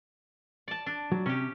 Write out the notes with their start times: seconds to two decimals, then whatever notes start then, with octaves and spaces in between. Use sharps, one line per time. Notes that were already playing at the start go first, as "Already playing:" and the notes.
0.68 D5 A5
0.86 D4
1.12 F#3
1.26 C3 C#4 G4